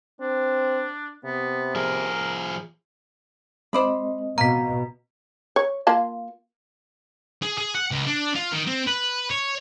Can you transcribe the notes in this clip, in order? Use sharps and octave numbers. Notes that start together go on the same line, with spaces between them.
C4 D4
C3 B3
F3 G#4 A#4
G#3 C4 C5 D5 D#5 B5
B2 A#3 A#5 B6
C#5
A#3 F4 A5
G#4
G#4
F#5
C#2
D4
F4
D#3
C4
B4
C#5